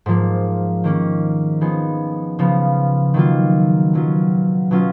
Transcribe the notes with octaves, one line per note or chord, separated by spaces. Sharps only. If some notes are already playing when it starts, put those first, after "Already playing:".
G#2 F3 A#3
D#3 A#3 C#4
F3 B3 D#4 G#4
C#3 F3 B3
D#3 F#3 A#3 F4
B2 F#3 C#4 F4
B2 F#3 C#4 F4